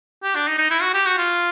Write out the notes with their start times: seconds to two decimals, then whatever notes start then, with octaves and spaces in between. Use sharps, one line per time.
0.23 G4
0.35 D4
0.47 D#4
0.58 D#4
0.70 E4
0.82 F#4
0.94 G4
1.06 F#4
1.18 F4